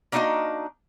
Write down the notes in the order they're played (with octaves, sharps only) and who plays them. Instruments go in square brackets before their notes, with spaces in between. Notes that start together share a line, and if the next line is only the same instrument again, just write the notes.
[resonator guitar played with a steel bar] A#3 D4 D#4 F4 F#4 D#5